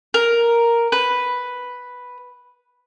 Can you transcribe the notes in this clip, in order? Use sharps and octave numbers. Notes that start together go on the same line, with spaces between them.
A#4
B4